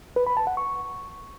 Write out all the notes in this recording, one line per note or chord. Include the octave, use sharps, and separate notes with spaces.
B4
B5
A5
F#5
C#6